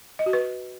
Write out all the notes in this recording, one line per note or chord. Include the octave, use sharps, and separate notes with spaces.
D#5
F#4
B4